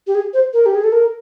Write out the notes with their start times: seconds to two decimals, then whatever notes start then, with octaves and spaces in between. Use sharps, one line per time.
0.07 G4
0.15 G#4
0.34 C5
0.53 A#4
0.66 G4
0.75 G#4
0.84 A4
0.92 A#4